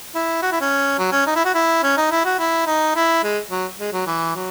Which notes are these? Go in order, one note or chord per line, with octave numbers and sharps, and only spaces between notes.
E4
F#4
E4
C#4
F#3
C#4
D#4
E4
F#4
E4
C#4
D#4
E4
F#4
E4
D#4
E4
G#3
F#3
G#3
F#3
E3
F#3